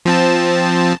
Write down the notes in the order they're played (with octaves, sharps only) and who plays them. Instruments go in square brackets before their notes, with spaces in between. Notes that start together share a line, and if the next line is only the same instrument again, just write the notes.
[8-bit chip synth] F3 C4 A5